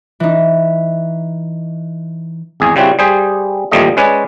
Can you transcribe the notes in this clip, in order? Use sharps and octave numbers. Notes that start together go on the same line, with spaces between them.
E3 D#4
G#1 E2 G#4
C#3 G3 C4 E4 F#4
G3 G#4 C5
A1 D#2 F3 G3 A3 D#5
G#3 C#4 B4 C#5 D5